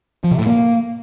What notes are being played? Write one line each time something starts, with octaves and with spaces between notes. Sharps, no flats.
F3
C3
A2
A#3